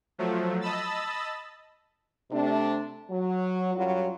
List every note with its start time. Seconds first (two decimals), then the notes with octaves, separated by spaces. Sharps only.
0.18 F3 F#3 A3
0.61 D#5 A5 B5 E6 A6
2.32 C3 A3 D4
3.10 F#3
3.75 F#2 F#3 G3 F4 F#4